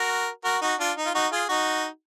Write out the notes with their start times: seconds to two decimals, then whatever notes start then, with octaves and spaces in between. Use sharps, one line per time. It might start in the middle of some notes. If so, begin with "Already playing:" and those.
Already playing: F#4 A#4
0.44 F#4 A#4
0.62 D#4 F#4
0.79 D4 F4
0.97 D#4
1.06 F4
1.15 D#4 F#4
1.32 F4 G#4
1.49 D#4 F#4